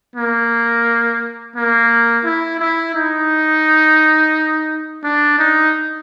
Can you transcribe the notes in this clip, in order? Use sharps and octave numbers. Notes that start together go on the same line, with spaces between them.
A#3
A#3
E4
E4
D#4
D4
D#4